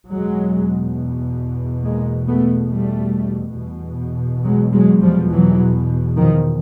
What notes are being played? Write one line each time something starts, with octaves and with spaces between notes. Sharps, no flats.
E2 B2 F#3 G#3
G#3 A#3
A3 B3
G3 A3
E2 B2
F#3 G#3
F#3 G#3
F3 G3
E3 F#3
D#3 F3